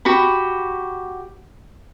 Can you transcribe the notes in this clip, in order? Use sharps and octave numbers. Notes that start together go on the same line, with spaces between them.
F#4 G4 B5